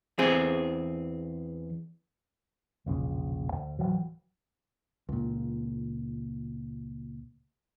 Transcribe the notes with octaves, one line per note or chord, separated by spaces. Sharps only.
E2 C4 G#4
E1 A#1 C#3
D2
D1 E3 F#3
C#2 A#2